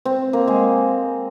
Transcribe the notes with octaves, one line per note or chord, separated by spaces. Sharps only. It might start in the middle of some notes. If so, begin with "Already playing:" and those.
C4
A#3
G#3